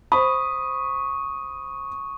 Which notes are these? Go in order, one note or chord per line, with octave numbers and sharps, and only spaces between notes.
C5 B5 C#6 D#6